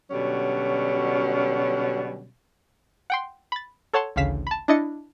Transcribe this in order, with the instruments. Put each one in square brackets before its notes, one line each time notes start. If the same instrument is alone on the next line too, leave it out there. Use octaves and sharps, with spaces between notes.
[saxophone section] B2 D3 F#3 G3 C#4
[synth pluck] F#5 G5 C6
B5 A6
A4 C#5 F#5 A5 C6
A1 D2 C#3 F5 B6 E7
A5 B5
D4 E4 D#5 A6 C#7